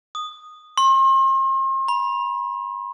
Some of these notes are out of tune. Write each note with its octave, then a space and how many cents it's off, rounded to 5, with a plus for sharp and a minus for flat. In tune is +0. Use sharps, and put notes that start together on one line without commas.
D#6 -10
C6 +40
B5 -30